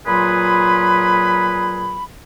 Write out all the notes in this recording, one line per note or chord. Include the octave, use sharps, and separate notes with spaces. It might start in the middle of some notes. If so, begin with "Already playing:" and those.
A#2 F#3 F4 G#4 B4 B5